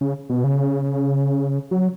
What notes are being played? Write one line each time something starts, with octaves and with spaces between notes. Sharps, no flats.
C#3
B2
C#3
F#3